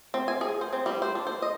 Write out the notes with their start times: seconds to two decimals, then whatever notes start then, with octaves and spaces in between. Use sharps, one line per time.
0.14 C4
0.28 G#5
0.41 G#4
0.61 C5
0.73 C4
0.86 G3
1.02 C5
1.15 D4
1.27 C5
1.42 D#5